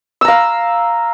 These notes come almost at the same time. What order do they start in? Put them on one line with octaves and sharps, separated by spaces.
E6 A#5 F5